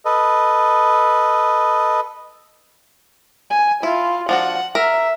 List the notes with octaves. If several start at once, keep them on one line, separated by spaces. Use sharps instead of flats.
A4 B4 D#5
G#5
E4 F4
F3 D4 F#4 F#5
A#4 E5